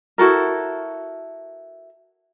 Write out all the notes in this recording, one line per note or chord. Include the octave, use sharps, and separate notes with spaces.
E4 F#4 A4 A#4